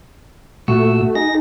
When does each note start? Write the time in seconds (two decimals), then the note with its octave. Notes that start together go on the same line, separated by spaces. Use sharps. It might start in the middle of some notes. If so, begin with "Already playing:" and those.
0.68 A#2 A3 F#4 E6
1.15 D#4 G#4 A#6